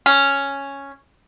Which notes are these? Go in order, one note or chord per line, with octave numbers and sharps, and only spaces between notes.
C#4